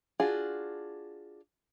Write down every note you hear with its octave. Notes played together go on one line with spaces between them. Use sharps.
D4 F4 F#4 G#4